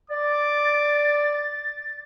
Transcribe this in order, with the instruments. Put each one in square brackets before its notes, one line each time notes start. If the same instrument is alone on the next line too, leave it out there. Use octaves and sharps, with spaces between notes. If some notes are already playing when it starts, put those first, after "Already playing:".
[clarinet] D5 [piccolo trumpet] D6 [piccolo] A6